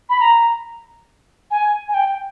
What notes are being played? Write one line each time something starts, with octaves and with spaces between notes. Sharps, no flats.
B5
A#5
G#5
G#5
G5